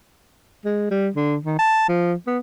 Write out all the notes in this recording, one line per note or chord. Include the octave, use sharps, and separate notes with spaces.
G#3
G3
D3
D#3
A5
F3
B3